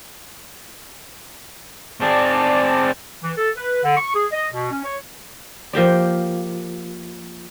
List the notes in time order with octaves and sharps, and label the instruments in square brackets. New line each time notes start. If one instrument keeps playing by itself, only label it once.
[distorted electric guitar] C4 G#4 [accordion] D5 A5
[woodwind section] E3
A4
B4
D3
C#6
G#4
D#5
B2
C#4
C#5
[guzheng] F3 A#3 G4 D5